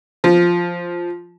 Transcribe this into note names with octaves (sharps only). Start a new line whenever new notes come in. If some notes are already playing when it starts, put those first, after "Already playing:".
F3